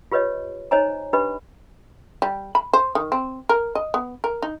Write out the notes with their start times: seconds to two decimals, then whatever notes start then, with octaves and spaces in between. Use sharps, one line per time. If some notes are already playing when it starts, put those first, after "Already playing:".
0.12 F4 G4 B4 C#5 D#5
0.71 D#4 C5 C#5 D#5 G#5 A#5
1.13 D4 G4 B4 D#5 B5
2.22 G3
2.55 B5
2.73 C5
2.95 D#3
3.12 C4
3.49 A#4
3.75 D#5
3.94 B3
4.24 A#4
4.42 D#4